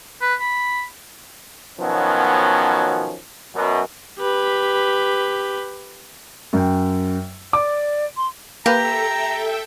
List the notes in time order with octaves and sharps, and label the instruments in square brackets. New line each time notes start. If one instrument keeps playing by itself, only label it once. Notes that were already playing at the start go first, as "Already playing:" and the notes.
[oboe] B4
B5
[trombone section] B2 D#3 F3 F#3 B3 C#4
F#2 B2
[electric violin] G4 B4
[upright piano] F#2 G5
[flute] D5 [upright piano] D6
[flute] C6
[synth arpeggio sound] A#3 B4 [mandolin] G4 [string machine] A4 E5 G5 [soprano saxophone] A#5